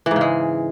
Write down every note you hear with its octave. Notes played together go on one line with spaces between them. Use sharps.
G#2 C#3 E3 G#3